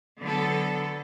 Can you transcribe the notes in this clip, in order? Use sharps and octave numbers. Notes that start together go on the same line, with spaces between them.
D3 F#3 B3 A4